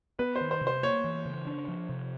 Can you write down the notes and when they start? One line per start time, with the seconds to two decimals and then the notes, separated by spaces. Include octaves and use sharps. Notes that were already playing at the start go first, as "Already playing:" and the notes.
0.19 B3 B4
0.36 C5
0.41 D#3
0.51 C5
0.61 C3
0.67 C5
0.83 A#3 C#5
1.04 E3
1.26 C#3
1.47 D4
1.68 F3
1.89 C3